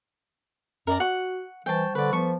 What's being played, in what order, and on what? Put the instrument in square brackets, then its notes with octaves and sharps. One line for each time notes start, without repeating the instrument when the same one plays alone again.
[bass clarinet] F#2 [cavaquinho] A#4 D5 A#5
[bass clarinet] F#4 [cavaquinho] F#5 C#6
[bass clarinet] E3 [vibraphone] G3 C5 C#6 [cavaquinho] G5 A5
[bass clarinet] D3 [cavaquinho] B4 D5
[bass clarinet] F3 [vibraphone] B3 A4 B4 [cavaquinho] C#6